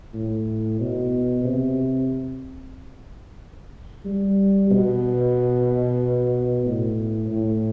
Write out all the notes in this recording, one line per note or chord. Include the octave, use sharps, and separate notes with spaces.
A2
B2
C3
G3
B2
A2
A2